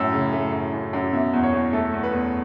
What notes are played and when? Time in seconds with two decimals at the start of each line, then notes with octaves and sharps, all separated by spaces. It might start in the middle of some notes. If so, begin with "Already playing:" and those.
Already playing: F#2 A2 E6
0.12 C#3
0.32 A3
0.52 F#2
0.73 F#2
0.93 F#2
1.13 B2 E5
1.33 E2
1.43 C#5
1.53 E2
1.73 A3 A4
1.94 E2
2.03 B4
2.13 E2